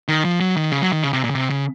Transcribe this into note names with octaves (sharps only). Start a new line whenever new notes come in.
D#3
F3
F#3
D#3
C#3
F#3
D#3
C#3
C3
A#2
C#3
C3
C#3